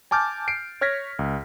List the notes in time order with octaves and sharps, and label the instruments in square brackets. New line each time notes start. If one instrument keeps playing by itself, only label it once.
[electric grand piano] G#5 A5 D6 F6 G6 A6
C7 D7
C#5 F6 G#6 A#6 B6
C#2